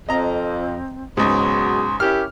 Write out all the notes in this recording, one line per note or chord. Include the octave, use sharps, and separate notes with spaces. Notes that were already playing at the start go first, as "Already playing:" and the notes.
F2 C4 D#5 A#5
C#2 G#2 B2 F#3 G#4 C6
C#4 E4 G4 A#4 F6